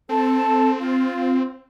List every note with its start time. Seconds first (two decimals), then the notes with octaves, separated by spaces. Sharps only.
0.09 C4 A4 A5
0.79 F4